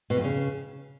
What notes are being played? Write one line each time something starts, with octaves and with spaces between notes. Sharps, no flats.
B2
F2
C#3